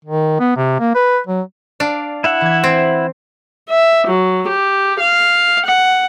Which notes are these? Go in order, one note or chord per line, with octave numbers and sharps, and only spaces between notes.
D#3
B3
C3
A#3
B4
F#3
D4 D5 F5
E4 E5 F#5
E3 G#6
C4
E5
F#3
G4
F5
F#5